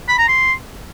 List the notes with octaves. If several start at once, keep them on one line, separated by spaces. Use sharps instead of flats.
B5
A#5
C6